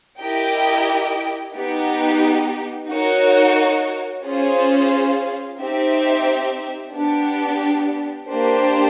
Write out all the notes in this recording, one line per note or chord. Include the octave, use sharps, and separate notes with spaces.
E4 G4 A#4 D#5 G5
B3 D#4 G4
D#4 F#4 A#4 C#5
C#4 F4 G#4 C5 F5
C4 D#4 G4 C5 E5
B3 D4 G4
A#3 D4 G4 C5